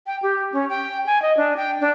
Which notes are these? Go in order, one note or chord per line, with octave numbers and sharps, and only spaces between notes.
G5
G4
C#4
G5
G#5
D#5
D4
G5
D4